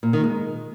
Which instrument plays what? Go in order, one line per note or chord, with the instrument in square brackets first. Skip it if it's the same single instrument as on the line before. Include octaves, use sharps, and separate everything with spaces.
[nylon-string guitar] A#2
D#3
G#3